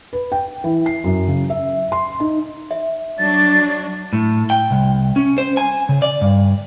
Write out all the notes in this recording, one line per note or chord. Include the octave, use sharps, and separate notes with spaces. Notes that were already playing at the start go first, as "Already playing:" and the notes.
B4
G5
E3
C7
F#2
C#3
E5
C6
D#4
E5
F#3 D4 A6
A2
G5
C2
C#4
C5
G#5
C#3
D5
G2